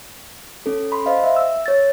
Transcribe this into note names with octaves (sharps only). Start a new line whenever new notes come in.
C#4 A4
B5 C6
C5 D#5 F5
E5
E6
C#5 A6